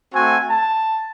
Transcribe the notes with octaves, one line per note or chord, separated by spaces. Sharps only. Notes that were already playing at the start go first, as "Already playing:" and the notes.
A3 C4 F#4 G#5
A5